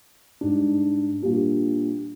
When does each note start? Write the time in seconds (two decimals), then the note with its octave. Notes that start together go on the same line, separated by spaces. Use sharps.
0.41 G#2 G3 D4
1.22 A#2 G3 D4